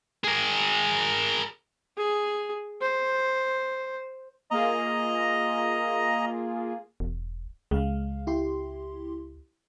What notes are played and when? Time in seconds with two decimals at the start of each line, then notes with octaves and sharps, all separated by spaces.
0.24 G#4 A#4
1.97 G#4
2.81 C5
4.51 A#3 F4 G#4 D#5 A#5
7.00 E1
7.71 C#2 G#3 F5
8.27 E4 G4 C6